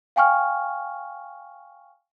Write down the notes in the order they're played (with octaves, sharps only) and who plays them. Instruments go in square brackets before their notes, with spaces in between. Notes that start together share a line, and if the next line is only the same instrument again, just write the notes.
[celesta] F5 G5 G#5 C#6 F6